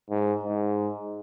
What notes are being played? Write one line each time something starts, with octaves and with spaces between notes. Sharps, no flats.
G#2
G#2